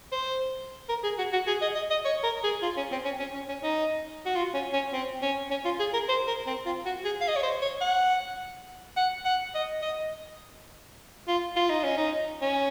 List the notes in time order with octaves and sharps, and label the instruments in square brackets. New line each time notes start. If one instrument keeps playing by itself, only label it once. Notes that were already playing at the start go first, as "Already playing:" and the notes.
[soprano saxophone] C5
A#4
G#4
F#4
F#4
G#4
D#5
D#5
D#5
C#5
A#4
G#4
F4
C#4
C4
C#4
C#4
C#4
C#4
D#4
F#4
F4
C#4
C#4
C4
C#4
C#4
F4
G#4
A#4
C5
A#4
C4
F4
F#4
G#4
F5
D#5
C#5
C5
C#5
F#5
F#5
F#5
D#5
D#5
F4
F4
D#4
C#4
D#4
C#4